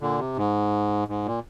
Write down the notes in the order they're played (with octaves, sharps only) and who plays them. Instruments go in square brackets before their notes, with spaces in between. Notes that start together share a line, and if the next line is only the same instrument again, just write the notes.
[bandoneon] A#2 D3
C3
G#2
G#2
A#2